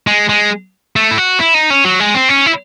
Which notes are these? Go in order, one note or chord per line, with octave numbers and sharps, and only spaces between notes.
G#3
G#3
A3
E4
F#4
E4
D#4
C#4
F#3
G#3
C4
C#4
E4